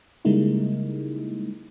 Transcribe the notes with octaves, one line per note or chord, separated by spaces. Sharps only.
C#3 G3 G#3 A#3 D#4 E4